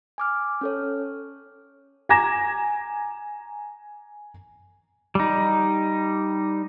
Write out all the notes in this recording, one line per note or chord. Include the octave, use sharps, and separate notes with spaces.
G#5 D6 F6
C#4 A4 C#5
G#5 A#5 D6 G#6 A#6 E7
G3 D#4